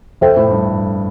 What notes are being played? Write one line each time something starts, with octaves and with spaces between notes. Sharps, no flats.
F2 A4 C5 E5 G5
A2
G2